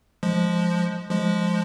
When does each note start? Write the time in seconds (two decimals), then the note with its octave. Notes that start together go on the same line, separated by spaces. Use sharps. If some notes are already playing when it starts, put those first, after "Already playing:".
0.23 F3 G#3
1.10 F3 G#3